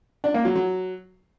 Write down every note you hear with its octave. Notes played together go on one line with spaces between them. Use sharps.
D4
A#3
F#3
F#3